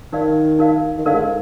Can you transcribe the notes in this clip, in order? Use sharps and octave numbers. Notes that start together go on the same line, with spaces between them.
D#3 D#4 A#4 D5 F5
D#4 A#4 D5 F5
D#3
D3 D#4 A#4 D5 F5
G#2